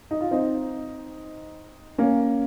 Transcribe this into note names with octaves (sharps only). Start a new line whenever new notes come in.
D#4
F4
C4 D#4
A#3 C#4